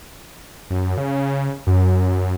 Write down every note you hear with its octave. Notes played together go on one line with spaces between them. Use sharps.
F#2
C#3
F#2